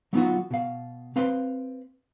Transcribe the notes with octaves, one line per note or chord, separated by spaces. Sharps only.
F#3 G3 B3 D#4 F4 F#4
B2 F5
C4 B4 F5 C6